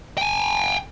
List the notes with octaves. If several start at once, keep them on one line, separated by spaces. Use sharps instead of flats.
G5 G#5